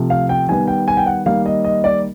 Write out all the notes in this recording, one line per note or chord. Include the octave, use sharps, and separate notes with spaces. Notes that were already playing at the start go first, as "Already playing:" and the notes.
Already playing: C3 F3 A3
F5
G5
D#3 G3 B3 G#5
G5
G#5
G5
F#5
D#3 G3 A#3 F5
D#5
D#5
D5